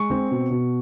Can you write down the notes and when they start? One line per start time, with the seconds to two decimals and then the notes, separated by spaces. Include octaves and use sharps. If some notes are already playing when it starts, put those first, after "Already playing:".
Already playing: G#3 C#6
0.10 C4
0.31 B2
0.50 B2